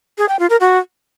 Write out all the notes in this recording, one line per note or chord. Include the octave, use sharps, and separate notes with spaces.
G#4
G5
F4
A#4
F#4